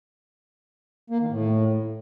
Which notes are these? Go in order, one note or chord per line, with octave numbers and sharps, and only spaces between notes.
A#3
D#3
A2